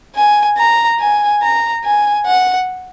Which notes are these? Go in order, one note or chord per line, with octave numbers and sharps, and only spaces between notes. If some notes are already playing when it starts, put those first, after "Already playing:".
G#5
A#5
G#5
A#5
G#5
F#5